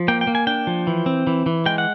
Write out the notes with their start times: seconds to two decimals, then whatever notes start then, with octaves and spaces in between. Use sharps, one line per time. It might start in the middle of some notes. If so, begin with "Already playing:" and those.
Already playing: F3
0.08 A#3 G5
0.21 G5
0.27 A#3
0.35 G#5
0.47 D4 G5
0.67 F3
0.87 E3
1.06 C4
1.27 E3
1.46 E3
1.66 G#3 G5
1.78 F#5